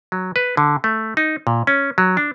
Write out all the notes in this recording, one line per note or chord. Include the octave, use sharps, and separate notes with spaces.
F#3
B4
D3
A3
D#4
A#2
C#4
F#3
D4